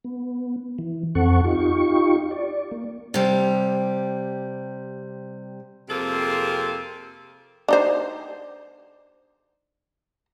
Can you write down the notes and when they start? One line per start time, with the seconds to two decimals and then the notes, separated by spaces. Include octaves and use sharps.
0.04 B3
0.79 E3
1.15 F2 C4 A4 F#5 C#6
1.44 D#4 F4 G4 C#6
2.31 D5
2.71 A#3
3.14 C3 G3
5.89 F2 C3 A#3 C4 G#4 A4
7.68 D4 D#4 C5